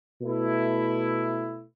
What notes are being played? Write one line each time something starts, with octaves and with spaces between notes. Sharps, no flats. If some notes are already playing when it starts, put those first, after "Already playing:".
B2 A3 E4